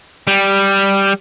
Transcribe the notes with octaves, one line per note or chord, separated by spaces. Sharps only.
G3